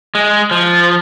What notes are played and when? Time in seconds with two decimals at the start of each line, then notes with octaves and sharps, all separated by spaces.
0.15 G#3
0.51 F3